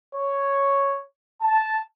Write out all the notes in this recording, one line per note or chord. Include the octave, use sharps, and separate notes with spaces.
C#5
A5